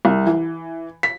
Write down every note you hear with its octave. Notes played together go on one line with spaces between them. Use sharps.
C2
E3
B6